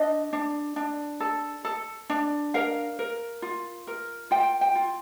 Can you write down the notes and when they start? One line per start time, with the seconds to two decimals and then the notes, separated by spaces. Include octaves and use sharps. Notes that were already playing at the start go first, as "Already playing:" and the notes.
Already playing: D4 D#5
0.33 D4
0.76 D4
1.20 A4
1.65 A4
2.10 D4
2.54 A#4 F5
2.99 A#4
3.42 F4
3.87 A#4
4.31 F4 G5
4.61 G5
4.75 F4